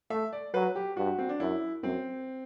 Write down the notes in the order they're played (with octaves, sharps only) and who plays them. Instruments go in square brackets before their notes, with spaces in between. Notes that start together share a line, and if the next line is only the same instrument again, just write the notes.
[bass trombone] A3 [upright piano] E5
[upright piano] D5
[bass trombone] F#3 [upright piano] B4
[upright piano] G4
[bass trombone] G2 [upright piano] F#4
[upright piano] C4
D4
[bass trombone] F#2 [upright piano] E4
[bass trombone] F#2 [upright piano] C4